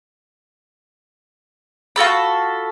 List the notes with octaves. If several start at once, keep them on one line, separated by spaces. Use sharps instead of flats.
F4 F#4 A4 B5